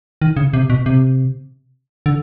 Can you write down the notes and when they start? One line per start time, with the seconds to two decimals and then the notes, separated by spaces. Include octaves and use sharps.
0.22 D#3
0.37 C#3
0.53 C3
0.70 B2
0.86 C3
2.06 D3